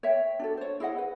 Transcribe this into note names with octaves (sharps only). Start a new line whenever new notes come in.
C#5 E5 G5
D4 F#4 A4
C5 C#5
E4 G#4 D#5 F#5
B4